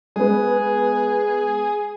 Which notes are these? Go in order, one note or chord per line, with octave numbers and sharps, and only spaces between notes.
G#3 B3 G#4